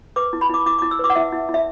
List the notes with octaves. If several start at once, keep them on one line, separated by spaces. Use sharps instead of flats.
B4 D6
E4
B5
E4 D6
E4 D6
E4 D6
E6
B4 D6
F#5
E4 E5
E4
E4
E5